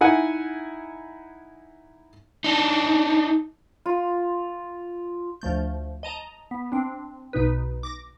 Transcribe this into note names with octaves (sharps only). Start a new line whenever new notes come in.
D#4 E4 F#5 G#5
D4 D#4
F4
D2 F3 A3 G6
D#5 A5 A#5
B3
C4 D4
B1 B2 D#4 B4
D6 A#6